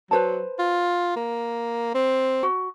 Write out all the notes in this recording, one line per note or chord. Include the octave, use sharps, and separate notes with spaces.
F#3 B4 C5 A5
F4
A#3
C4
F#4